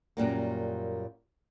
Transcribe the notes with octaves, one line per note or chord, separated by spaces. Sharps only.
F#2 A#2 G3 A#3